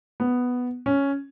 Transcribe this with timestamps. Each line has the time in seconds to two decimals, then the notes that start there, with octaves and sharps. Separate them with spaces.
0.20 B3
0.86 C#4